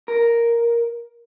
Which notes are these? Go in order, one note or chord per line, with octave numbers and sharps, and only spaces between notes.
A#4